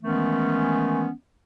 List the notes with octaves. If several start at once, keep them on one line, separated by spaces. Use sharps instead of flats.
D#3 E3 G#3 A3 B3 C#4